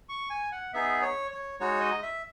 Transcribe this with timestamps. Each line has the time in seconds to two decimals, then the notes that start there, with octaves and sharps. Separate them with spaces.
0.09 C#6
0.30 G#5
0.52 F#5
0.73 B3 D#4 G#4 E5
1.02 C#5
1.31 C#5
1.60 G#3 D#4 F#4 C#5
1.81 D#5
2.03 E5